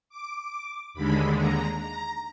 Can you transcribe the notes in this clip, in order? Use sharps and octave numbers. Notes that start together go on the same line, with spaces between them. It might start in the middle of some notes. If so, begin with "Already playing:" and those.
D6
D#2 D3 G#3 B5
A#5
A#5